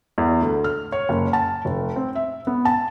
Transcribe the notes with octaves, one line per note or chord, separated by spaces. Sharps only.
E2
D2
F6
C#5
F#1
A5
F1
C4
E5
B3
A5